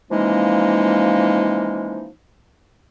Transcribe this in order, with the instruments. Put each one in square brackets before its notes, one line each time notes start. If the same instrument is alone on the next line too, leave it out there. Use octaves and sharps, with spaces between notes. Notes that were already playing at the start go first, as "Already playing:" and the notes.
[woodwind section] E3 F3 G#3 A#3 C#4 D#4